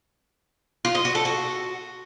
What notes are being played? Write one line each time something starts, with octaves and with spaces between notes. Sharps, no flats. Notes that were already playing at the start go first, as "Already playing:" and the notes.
F4
D#5
F#4
A4
F#4